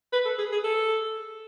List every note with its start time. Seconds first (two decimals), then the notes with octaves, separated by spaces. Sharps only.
0.13 B4
0.25 A4
0.38 G#4
0.52 G#4
0.64 A4